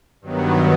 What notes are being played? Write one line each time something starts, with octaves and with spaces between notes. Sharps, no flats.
G2 D#3 F#3 B3